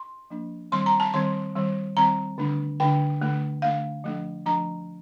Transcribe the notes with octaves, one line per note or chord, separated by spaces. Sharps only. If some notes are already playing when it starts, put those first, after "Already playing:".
Already playing: C6
F3 A#3 D4
D#3 G3 C4 C6
A#5
A5
D#3 G3 C4 C6
D#3 G3 C4
D#3 G3 C4 A#5
D3 A3 D4
D3 A3 D4 G5
D3 A3 D4
D3 A3 D4 F5
F3 A3 D4
F3 A3 D4 A#5